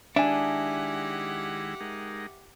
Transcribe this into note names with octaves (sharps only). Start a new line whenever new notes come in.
D#3 G#3 D4 E4 G4 E5 F#5 G#5
G#3 D#4 A#4